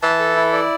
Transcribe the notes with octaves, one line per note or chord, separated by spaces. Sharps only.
E3 A5
A4
E4
D5